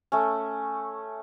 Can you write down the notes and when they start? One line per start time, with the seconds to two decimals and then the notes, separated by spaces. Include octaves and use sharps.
0.12 A3 C#4